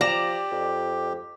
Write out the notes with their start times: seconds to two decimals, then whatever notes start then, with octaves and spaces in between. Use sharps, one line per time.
0.01 F3 G4 D5 A#5 E7
0.52 F2